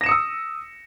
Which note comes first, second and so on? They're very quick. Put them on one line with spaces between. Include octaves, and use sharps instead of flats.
A#6 E7 C#7 D#6 E6